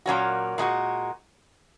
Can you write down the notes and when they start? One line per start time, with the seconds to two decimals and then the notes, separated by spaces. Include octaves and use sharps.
0.06 A#2 F#3 A#3 C#4 F#4
0.58 A#2 G#3 D#4 F#4